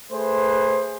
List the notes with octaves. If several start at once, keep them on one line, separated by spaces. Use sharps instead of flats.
A3 G#4 B4 C5